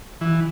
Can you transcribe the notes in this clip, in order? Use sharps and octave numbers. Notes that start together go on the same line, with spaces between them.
E3